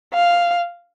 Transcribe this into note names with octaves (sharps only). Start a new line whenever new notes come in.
F5